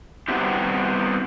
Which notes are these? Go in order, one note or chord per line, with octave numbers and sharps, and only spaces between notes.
G3 B3 C4 E4 F#4 G4